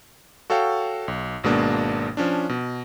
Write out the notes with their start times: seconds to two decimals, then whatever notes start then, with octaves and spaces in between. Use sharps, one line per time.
0.50 F#4 A4 C#5 F5 G5
1.08 B1
1.44 G#1 B2 G#3 A#3 D4
2.17 F3 C#4 D4
2.49 B2